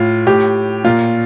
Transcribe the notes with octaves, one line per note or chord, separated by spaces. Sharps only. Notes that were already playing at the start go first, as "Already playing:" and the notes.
Already playing: A2 F4
A2 G4
A#2 F4